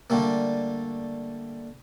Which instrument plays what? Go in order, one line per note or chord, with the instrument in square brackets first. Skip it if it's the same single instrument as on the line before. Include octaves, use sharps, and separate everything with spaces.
[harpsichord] D3 G3 A3 A#3